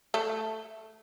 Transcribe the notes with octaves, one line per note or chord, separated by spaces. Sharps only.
A3